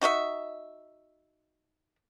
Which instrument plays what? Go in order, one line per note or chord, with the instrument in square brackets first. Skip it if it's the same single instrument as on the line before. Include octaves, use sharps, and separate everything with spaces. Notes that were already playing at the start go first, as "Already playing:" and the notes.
[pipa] D#4 F#4 D#5 E5